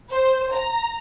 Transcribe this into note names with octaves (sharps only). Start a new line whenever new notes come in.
C5
A#5